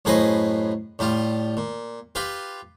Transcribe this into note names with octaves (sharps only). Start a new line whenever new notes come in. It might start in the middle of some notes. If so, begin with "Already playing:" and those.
F#2 A2 G#4 B4 C5 D#5
A2 G3 F4
A#2
F4 G4 B4